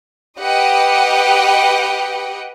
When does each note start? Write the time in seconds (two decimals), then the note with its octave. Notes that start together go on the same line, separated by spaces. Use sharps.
0.40 G4 B4 D#5 F#5 G5